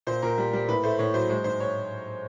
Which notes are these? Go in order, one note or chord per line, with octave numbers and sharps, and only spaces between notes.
A#2 C5
A#2 A#4
G3
G3 A#4
A2 B4
A3 C5
A2 C#5
F#3 C5
G#3 C5
G#2 C5
C#5